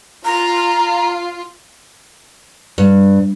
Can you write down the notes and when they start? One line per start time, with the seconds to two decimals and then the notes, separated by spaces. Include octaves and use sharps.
0.25 F4 A#5
2.78 G2